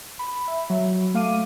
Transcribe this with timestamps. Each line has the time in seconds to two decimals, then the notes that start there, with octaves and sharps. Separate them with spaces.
0.19 B5
0.48 E5
0.70 F#3
1.14 A3 F5 D6 D#7